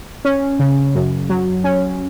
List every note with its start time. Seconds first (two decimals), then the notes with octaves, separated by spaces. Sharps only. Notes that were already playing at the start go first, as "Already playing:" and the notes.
0.25 C#4
0.59 C#3
0.95 F#2
1.29 F#3
1.64 C#4